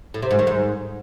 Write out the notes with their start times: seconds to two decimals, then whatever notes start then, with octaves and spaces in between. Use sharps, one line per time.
0.14 A2
0.22 C3
0.31 G#2
0.39 D#3
0.47 G#2